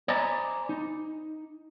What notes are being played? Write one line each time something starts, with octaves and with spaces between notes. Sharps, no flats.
C5 D5 D#5 G#5 A#5 B5
D#4